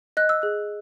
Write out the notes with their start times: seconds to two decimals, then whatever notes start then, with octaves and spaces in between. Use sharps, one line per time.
0.17 D#5 F#6
0.29 E6
0.42 G#4 F#6